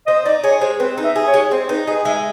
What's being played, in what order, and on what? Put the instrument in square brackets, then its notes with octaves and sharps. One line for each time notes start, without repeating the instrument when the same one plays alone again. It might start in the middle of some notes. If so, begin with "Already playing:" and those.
[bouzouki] C4 [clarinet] D#5
[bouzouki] D#4 [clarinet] D5
[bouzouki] G#4 [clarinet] C#5
[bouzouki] G#3 [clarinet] C5
[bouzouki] C4 [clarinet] B4
[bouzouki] D#4
[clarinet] E5
[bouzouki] G#4
[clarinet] C#5
[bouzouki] G#3
[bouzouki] C4 [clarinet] C5
[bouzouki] D#4 [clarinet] B4
[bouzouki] G#4 [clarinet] D#5
[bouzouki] G#3 [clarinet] E5